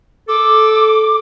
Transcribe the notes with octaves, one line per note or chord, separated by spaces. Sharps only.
A4 D6